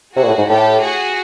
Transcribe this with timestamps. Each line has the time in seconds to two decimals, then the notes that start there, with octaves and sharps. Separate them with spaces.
0.16 C3 F#4 G#4
0.24 A#2
0.27 A2
0.38 G#2
0.49 A2 G4 A4
0.82 F#4 G#4